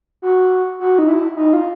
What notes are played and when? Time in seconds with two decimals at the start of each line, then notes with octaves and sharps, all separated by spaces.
0.22 F#4
0.80 F#4
0.99 D#4
1.08 E4
1.36 D#4
1.53 F4